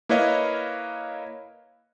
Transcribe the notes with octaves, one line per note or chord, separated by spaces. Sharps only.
A#3 E4 B4 C#5 D#5 F5